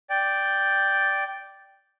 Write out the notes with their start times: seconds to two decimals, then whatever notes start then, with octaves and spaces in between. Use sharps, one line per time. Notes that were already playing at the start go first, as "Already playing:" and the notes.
0.10 D5 G5